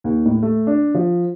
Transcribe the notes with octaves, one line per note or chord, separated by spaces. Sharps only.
D#2
A2
A3
D4
F3